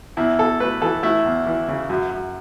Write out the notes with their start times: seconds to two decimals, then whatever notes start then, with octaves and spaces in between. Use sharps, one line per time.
0.17 E2 E4
0.38 E2 A4
0.60 A3 B4
0.81 E3 A4
1.03 A3 E4
1.26 E2
1.46 E3
1.68 C#3
1.89 F#2
2.11 F#2